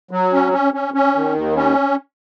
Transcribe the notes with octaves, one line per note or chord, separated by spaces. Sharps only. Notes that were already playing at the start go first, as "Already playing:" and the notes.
F#3
C#4
C#4
C#4
C#4
D#3
D#2
C#4